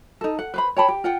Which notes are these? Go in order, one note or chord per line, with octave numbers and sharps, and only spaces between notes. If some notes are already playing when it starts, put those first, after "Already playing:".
D#4 A4
F#5
B4 C5 B5
C#5 G5 A5 B5
G4
F4 F#5 G5